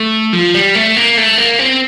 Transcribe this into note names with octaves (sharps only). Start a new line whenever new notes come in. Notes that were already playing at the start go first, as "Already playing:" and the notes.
Already playing: A3
F3
G3
A3
A#3
A3
A#3
C4